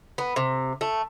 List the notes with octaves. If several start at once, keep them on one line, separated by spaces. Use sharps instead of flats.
B3
C3
A3